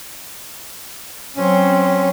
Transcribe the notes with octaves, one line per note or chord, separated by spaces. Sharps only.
F#3 C4 C#4